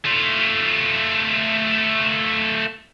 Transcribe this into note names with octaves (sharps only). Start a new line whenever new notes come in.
A3 F4